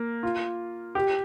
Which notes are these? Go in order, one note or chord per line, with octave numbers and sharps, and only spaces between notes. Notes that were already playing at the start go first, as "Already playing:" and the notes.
Already playing: A#3
F4
G4